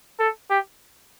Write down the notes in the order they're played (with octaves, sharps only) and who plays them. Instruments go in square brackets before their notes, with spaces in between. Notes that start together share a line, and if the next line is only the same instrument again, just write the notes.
[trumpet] A4
G4